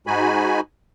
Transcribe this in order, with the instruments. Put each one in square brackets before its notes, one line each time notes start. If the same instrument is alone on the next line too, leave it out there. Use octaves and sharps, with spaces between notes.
[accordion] G#2 G#3 D#4 F#4 G#5 B5